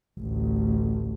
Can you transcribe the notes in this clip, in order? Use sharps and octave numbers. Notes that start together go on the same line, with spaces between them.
A1 D2